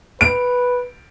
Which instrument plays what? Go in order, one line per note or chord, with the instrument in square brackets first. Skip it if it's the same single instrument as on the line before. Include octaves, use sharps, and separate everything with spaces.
[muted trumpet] B4 [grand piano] D7